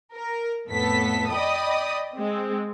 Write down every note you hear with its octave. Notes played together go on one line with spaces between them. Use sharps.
A#4
F2 A2 A3 B3 A4 B6
D5 D#5 G5 B5 D#6
G#3 C4